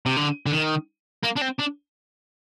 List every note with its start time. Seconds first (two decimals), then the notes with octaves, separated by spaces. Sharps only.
0.06 C3
0.16 D3
0.46 D3
0.52 D#3
1.24 A#3
1.37 D4
1.42 C4
1.60 D4